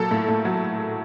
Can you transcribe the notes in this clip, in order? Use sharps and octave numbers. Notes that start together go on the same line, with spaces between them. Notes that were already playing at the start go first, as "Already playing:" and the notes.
Already playing: A#2 F#3 A4
A2
A2
F#3